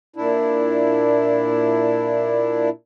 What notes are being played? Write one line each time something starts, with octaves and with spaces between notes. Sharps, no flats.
A#2 D4 E4